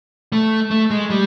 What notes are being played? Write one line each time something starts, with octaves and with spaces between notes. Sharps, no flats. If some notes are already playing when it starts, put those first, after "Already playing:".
A3
A3
G#3
G3